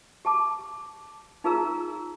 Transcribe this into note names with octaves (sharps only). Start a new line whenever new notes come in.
G4 A5 D6
D#4 F4 G#4 A#4 A#5 E6